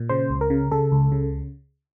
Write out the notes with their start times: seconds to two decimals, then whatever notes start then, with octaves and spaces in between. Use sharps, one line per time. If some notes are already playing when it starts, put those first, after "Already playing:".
Already playing: A#2
0.09 C#3 C5
0.30 C#2
0.41 A#4
0.50 C#3
0.71 C#3 A4
0.92 C#2
1.12 C#3